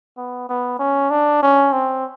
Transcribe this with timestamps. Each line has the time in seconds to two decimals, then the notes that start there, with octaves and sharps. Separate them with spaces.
0.18 B3
0.49 B3
0.79 C#4
1.10 D4
1.43 C#4
1.72 C4